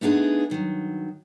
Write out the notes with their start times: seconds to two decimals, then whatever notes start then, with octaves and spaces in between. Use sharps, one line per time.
0.01 A3 B3 D4 D#4 G#4
0.50 G2 D#3 E3 F#3